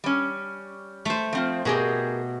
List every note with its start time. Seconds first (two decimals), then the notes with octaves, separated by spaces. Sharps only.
0.04 G3 C#4
1.05 A3 C5
1.33 F3 C4 F4
1.65 B2 G4 G#4 A#4